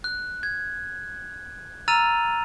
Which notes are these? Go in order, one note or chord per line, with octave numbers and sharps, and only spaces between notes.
F#6
G#6
A#5 E6 F6 A6 D#7 F7